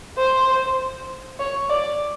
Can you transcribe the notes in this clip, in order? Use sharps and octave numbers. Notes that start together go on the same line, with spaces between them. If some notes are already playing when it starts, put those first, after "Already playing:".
C5
C#5
D5